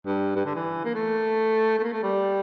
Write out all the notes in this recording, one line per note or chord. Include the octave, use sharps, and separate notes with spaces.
G2
G2
D3
E3
A#3
A3
A3
A#3
A3
G3